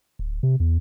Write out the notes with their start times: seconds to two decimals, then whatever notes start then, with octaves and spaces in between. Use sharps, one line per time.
0.19 D1
0.43 C3
0.60 E2